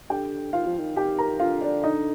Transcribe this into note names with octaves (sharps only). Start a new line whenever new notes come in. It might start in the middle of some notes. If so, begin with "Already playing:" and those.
D3 G4 G5
D#3 F4 F5
F3
D#3
D#3 G4 G5
A#4 A#5
D3 F4 F5
D4 D5
D#4 D#5